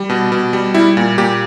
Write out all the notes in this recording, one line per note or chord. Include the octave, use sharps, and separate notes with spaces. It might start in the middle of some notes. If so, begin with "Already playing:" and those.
Already playing: G3
B2
B2
G3
G3 E4
A#2
A#2 G4